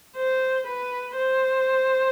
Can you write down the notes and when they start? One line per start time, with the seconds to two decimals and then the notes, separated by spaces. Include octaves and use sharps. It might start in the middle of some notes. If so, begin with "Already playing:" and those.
0.16 C5
0.67 B4
1.17 C5